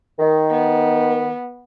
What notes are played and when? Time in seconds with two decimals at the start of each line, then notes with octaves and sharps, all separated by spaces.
0.19 D#3
0.50 B3